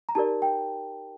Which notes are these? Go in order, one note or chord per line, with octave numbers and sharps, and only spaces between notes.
A#5
D#4 G4 A#4 D5 A5
G5